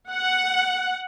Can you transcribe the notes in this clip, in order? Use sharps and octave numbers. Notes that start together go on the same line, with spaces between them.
F#5